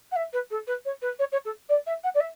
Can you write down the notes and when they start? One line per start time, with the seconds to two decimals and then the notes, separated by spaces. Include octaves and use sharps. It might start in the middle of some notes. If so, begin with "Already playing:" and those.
0.11 F#5
0.15 E5
0.32 B4
0.50 A4
0.67 B4
0.85 C#5
1.01 B4
1.19 C#5
1.32 C#5
1.44 A4
1.69 D5
1.86 E5
2.03 F#5
2.14 D5
2.20 E5